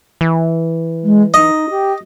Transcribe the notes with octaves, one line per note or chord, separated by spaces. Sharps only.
E3
G#3
D#4 D#5
G4